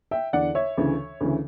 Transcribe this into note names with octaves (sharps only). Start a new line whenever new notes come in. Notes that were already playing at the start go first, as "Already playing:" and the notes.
E5 G5
E2 D3 D5 F#5
C#5 E5
D2 C#3 E3
D2 C#3 E3